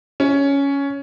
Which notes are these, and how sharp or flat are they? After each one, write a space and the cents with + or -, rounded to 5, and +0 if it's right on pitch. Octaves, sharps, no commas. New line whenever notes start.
C#4 +10